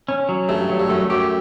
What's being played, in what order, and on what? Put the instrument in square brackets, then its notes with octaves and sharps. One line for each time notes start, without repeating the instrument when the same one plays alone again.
[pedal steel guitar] C#4
F#3
[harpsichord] G2 [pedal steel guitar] A3
[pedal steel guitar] F#3
[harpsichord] G2
[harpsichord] F#2 [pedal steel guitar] A3
[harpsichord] F#2 [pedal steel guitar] G4